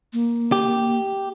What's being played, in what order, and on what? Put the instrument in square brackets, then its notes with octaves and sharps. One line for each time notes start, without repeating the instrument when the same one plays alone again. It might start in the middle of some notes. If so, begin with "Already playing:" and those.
[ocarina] A#3
[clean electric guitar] G4